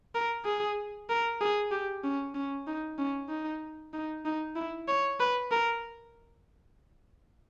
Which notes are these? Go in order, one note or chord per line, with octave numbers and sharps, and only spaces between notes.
A#4
G#4
A#4
G#4
G4
C#4
C#4
D#4
C#4
D#4
D#4
D#4
E4
C#5
B4
A#4